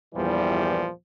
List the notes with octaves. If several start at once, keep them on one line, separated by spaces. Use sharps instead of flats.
E2 G2 A#2 E3 F3 G3